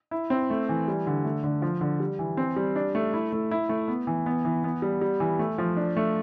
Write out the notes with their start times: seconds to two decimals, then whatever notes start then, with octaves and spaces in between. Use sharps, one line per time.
0.11 E4
0.30 C4
0.50 A3
0.69 E3
0.88 G3
1.07 D3
1.24 A3
1.44 D3
1.62 F3
1.81 D3
2.00 G3
2.19 E3
2.37 C4
2.56 G3
2.76 D4
2.95 A3
3.14 E4
3.32 A3
3.51 E4
3.69 A3
3.88 B3
4.07 E3
4.26 B3
4.45 E3
4.64 B3
4.82 G3
5.01 G3
5.20 E3
5.39 A3
5.58 F3
5.77 D4
5.96 A3